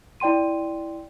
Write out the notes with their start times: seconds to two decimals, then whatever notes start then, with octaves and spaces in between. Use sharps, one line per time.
0.20 E4 D5 G5 C6 D#7